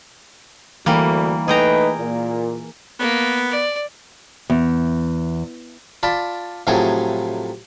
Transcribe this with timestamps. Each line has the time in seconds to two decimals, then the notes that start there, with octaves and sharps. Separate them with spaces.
0.86 D2 E3 G3 A#3
1.48 A3 D#4 G#4 B4 G5 A#5
1.97 A#2
2.99 A#3 B3
3.50 D5
4.50 E2
6.03 F4 D5 A5 B5
6.67 A2 C3 F3 F#3 G#4 A4